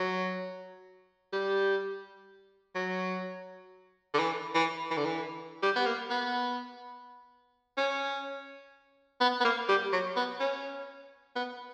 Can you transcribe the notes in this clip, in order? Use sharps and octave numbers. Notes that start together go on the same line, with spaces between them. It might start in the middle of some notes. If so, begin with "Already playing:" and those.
Already playing: F#3
G3
F#3
D3
E3
E3
E3
D3
E3
G3
B3
A#3
B3
C#4
B3
B3
A#3
G3
F#3
B3
C#4
B3